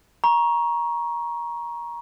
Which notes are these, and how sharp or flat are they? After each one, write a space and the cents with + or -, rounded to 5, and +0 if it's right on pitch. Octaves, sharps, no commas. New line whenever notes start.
A#5 +20 C#6 +0